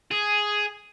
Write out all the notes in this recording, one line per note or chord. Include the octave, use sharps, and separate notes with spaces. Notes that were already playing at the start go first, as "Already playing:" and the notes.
G#4